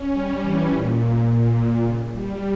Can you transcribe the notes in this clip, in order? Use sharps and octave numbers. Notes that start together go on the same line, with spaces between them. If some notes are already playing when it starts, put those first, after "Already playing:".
Already playing: C#4
G3
E3
A#2
C#3
G3